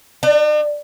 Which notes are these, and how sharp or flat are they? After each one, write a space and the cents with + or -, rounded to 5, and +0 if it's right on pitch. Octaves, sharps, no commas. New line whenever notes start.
D4 +45